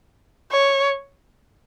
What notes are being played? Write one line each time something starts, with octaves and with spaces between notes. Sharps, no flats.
C#5